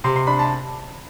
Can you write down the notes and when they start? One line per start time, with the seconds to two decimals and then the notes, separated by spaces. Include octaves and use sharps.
0.04 C3 C6
0.16 C6
0.27 D4 B5
0.39 A5